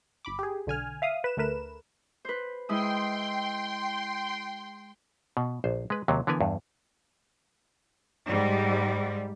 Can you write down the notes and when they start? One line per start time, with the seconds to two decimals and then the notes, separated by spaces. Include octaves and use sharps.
0.25 G1 B5 D6
0.39 G4 G#4
0.66 B1 D3 G#5 F6
1.02 E5 F5 D#6
1.24 B4 E7
1.37 D2 A3 A#4 B4 E7
2.25 B4 C5
2.69 G#3 E4 G5 C6 D#6
5.37 B2
5.64 A#1 C5
5.90 G#3 B4
6.08 D#2 C3 F#3
6.27 D3 E3 B3 A#4 B4 G#5
6.41 E2 G2
8.26 G#2 G3